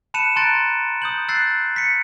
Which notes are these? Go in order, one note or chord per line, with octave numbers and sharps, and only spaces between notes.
A5 B5 F#6 C#7 D#7 E7
A5 A#5 C6 F#6 A6 D7
D#6 G6 F#7
E6 F#6 G6 A6 C7
B6 C#7